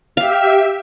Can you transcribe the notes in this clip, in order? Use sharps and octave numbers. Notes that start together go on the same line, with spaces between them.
G4 E5 F5